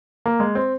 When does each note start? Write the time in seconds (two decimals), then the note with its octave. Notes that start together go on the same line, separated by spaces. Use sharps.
0.26 A#3
0.40 G#3
0.55 C4